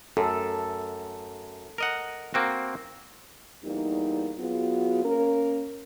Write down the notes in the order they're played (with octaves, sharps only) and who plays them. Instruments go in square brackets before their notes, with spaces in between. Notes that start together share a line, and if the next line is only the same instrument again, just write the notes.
[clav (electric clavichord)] F#2 [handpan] A4
[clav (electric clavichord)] A#4 D#5 F#5
A#3 C4 F#4
[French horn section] E2 G3 A#3 D#4
F#3 B3 F4 F#4 G#4
A#3 C#4 A#4